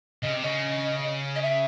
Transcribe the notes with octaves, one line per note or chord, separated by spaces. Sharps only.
C#3 D#5
C3
C#3 D#5
D#5
E5